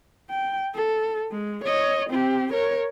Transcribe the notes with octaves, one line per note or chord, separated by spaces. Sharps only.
G5
A4
G#3
C#5 D#5
C4 G4
A#4 C#5